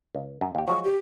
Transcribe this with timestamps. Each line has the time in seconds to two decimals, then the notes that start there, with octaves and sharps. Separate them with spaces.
0.15 C#2
0.41 F#2
0.55 D#2 G4
0.68 F3 F#3 G#3 C#6
0.84 G4